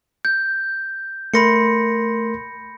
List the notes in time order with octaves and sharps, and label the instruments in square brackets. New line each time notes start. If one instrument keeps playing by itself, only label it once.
[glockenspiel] G6
[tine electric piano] A3 A#4 C6 [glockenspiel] B5 A#6 C#7